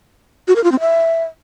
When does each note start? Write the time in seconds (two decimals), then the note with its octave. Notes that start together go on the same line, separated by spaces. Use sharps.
0.48 F#4
0.56 A#4
0.64 F4
0.72 C4
0.80 E5